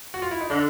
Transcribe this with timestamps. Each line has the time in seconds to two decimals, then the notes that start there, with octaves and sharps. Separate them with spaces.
0.14 F#4
0.22 F4
0.31 E4
0.41 D#4
0.50 D3 D4